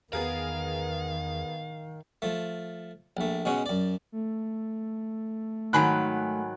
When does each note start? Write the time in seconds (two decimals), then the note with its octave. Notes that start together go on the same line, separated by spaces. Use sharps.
0.13 E2 D#3 B3 G#4 A#4 F5
2.22 F3 A3
3.17 A#1 A3
3.45 B2 G#3 C#4 F#4
3.66 F#2 D5
4.12 A3
5.73 G#2 D#3 F#3 G#5 B5 F#6